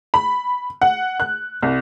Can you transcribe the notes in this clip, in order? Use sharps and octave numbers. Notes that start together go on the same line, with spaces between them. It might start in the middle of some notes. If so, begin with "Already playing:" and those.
B5
F#5
F#6
C2